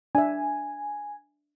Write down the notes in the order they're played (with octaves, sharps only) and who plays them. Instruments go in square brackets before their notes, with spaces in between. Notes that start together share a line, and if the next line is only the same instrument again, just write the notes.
[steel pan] D4 E5 [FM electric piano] G#5